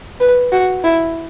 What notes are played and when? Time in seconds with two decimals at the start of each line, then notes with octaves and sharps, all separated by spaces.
0.20 B4
0.52 F#4
0.84 E4